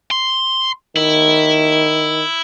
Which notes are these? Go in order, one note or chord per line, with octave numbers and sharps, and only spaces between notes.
C6
D#3 E4